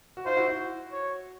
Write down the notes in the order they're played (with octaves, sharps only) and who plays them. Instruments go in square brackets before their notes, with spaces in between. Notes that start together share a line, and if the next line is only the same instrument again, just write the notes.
[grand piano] F#4
[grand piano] D#4 F4 [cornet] C5
[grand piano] E4 F#4
E4 F#4
[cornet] C#5